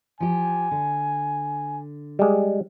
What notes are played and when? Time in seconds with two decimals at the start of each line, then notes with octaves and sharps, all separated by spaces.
0.20 F3 G4 G#5
0.71 D3
2.19 G3 G#3